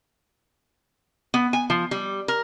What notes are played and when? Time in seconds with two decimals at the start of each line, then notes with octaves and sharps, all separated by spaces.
1.34 B3
1.53 G#5
1.70 F3
1.91 G3
2.28 A#4